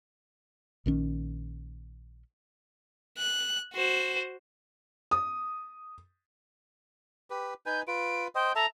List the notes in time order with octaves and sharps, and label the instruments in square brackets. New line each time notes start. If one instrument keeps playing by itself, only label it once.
[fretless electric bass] A#1 D#3 C#4
[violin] F#6
F#4 C5
[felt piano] D#6
[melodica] G4 B4
[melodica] D#4 B4 G#5 [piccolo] G6
[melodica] F4 B4 [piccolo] D7
[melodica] C5 D#5 [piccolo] G5
[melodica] A4 E5 A5 [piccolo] A#5